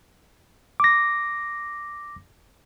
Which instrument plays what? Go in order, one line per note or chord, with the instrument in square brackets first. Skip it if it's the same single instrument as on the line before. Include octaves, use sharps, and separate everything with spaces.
[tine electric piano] D6 A#6